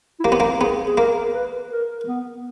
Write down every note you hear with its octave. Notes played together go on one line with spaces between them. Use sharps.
E4
A#3 G4
B3
A#3
B3 G#4
G#4
A#3 A#4
B4
A#4
B3